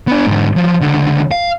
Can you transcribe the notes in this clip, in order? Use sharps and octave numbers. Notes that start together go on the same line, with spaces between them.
B3 D4
G#2 D3
F3 F#3
C#2 D3
F5